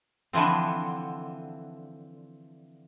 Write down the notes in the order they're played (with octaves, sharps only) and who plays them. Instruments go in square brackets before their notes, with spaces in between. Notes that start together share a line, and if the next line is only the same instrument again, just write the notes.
[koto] D3 E3 F3 C4